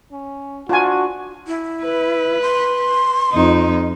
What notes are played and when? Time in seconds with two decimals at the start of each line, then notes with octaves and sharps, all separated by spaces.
0.12 C#4
0.69 D4 F4 F#4 G#5
1.47 E4
1.83 B4
2.42 C6
3.32 F2 D#4